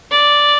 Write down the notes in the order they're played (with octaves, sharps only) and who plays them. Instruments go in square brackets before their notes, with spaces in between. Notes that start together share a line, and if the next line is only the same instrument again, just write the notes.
[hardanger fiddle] D5